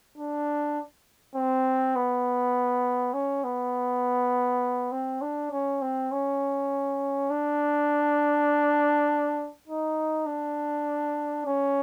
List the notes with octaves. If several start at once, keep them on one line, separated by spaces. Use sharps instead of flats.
D4
C4
B3
C#4
B3
C4
D4
C#4
C4
C#4
D4
D#4
D4
C#4